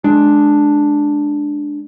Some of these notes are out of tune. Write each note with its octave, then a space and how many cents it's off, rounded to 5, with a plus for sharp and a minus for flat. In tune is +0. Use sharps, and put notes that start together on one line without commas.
G#3 +20 D4 +0